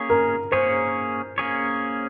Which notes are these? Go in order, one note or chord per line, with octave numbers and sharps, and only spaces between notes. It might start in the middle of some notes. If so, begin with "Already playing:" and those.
Already playing: A#3 C#4 G#4 C#5
A#4
A#3 C#4 G#4 C5 C#5
A#3 C#4 G#4 C#5